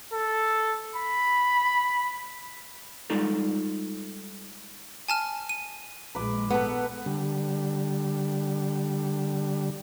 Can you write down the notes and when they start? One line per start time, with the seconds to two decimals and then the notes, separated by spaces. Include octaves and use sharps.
0.13 A4
0.96 B5
3.10 G3 G#3 D#4 F4 A4
5.08 G#5 A5 F6
5.49 D#7
6.15 A#1 G#3 B4 D6
6.50 B3 A4 B4 F#5
7.06 D3 G3